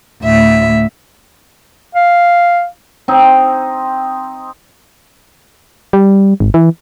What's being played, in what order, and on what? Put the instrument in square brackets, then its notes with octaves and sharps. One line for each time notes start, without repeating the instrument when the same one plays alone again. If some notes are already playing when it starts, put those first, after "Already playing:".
[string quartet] D2 A2 E5
[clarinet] F5
[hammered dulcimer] C4 D#4
[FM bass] G3
G#1
E3